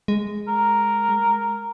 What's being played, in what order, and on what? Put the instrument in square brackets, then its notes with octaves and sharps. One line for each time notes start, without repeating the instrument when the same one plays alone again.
[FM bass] G#3
[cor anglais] A#4